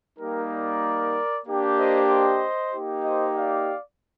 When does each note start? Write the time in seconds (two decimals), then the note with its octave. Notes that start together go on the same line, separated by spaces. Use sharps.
0.19 G3 A#3 D#4 G4 A#4
0.51 A#4 D5
1.46 A#3 D4 G4
1.77 C5 D#5
2.08 C5 D#5
2.73 A#3 D#4 G4
3.03 C5 D#5
3.36 D5 F5